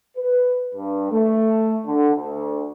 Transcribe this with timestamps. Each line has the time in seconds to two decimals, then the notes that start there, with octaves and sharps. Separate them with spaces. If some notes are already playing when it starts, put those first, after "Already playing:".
0.17 B4
0.75 G2
1.12 A3
1.86 D3
2.15 D2